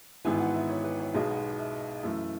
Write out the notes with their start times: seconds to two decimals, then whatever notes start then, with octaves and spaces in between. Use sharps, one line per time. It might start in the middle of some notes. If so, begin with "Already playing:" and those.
0.25 G#1 G#2 E3 B3 E4 G#5
0.40 F#5
0.54 E5
0.69 C#5
0.84 B4
1.00 C#5
1.14 B1 B2 G#3 D#4
1.29 F#5
1.58 E5
2.03 F#2 E3 A3